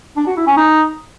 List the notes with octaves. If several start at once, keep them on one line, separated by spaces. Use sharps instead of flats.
D4
F#4
E4
C#4
D#4